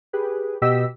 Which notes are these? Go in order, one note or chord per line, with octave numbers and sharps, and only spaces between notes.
G4 G#4 B4
B2 G4 D#5 E6 B6